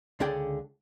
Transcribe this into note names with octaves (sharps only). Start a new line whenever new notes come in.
C#2 D3 D4 G#4 D5 G5